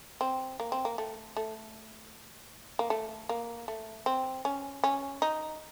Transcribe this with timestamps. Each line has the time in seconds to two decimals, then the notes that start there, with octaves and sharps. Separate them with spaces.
0.21 C4
0.60 A#3
0.72 C4
0.85 A#3
0.98 A3
1.37 A3
2.79 A#3
2.90 A3
3.29 A#3
3.68 A3
4.06 C4
4.45 C#4
4.84 C#4
5.22 D#4